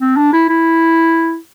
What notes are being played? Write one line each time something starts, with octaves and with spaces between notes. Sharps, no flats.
C4
D4
E4
E4